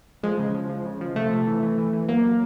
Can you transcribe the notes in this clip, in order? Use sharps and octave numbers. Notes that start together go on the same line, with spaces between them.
F3 G#3
C#3
F3
F3
C#3
F3
C3 A3
C3
E3
E3
E3
E3
F#3 A#3
F#3